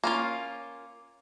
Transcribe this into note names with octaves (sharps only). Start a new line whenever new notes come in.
A#3 C#4 F4